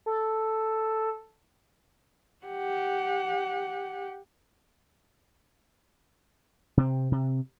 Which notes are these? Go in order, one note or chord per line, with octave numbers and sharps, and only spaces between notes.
A4
G4 F#5
C3 C4
C3